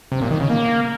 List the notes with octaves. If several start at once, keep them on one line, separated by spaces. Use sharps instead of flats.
C3
A#2
D#3
C#3
A#3